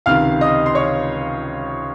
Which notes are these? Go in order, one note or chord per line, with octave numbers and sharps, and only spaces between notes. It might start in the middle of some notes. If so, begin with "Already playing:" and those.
C#2 C3 D#3 F5 F6
D#5 D#6
C6
C#5 C#6